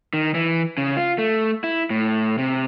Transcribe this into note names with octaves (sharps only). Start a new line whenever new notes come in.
D#3
E3
C#3
F4
A3
E4
A2
C3